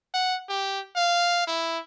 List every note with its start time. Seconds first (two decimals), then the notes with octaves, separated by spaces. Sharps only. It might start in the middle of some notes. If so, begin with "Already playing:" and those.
0.14 F#5
0.49 G4
0.96 F5
1.47 E4